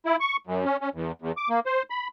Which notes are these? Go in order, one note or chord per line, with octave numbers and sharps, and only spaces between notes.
E4
C#6
F#2
C#4
C#4
E2
E2
D6
A#3
C5
B5